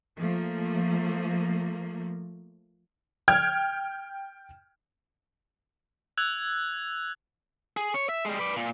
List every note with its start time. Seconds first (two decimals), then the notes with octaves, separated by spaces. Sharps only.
0.19 F3 A3 A#3
3.28 G5 F6 G#6
6.18 E6 F#6 G#6 F7
7.77 G#4
7.94 C#5
8.09 E5
8.25 G3 G#3
8.39 B4 D5
8.57 A#2